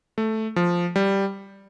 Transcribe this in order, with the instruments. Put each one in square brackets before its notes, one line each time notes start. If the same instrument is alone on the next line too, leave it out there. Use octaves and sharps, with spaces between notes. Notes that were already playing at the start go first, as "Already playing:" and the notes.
[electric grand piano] A3
F3
G3